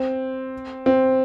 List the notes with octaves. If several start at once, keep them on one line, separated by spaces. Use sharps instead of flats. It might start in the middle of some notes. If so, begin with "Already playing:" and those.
Already playing: C4
C4